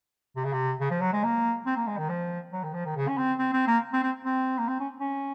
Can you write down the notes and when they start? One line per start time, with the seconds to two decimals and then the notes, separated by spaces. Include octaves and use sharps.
0.36 C3
0.44 C#3
0.53 C3
0.80 C#3
0.91 F3
1.01 F#3
1.13 G#3
1.24 A#3
1.66 C4
1.76 A#3
1.87 G#3
1.98 D#3
2.09 F3
2.53 F#3
2.64 D#3
2.74 F3
2.86 D#3
2.96 C#3
3.08 C#4
3.18 C4
3.38 C4
3.53 C4
3.67 A#3
3.93 C4
4.03 C4
4.25 C4
4.58 A#3
4.68 C4
4.80 C#4
5.00 C#4